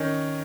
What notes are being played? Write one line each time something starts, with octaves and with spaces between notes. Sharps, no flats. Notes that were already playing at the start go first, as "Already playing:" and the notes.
Already playing: D#3 C#4 D#4